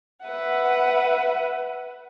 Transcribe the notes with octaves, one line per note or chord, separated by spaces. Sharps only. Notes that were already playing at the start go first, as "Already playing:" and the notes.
B4 E5 F#5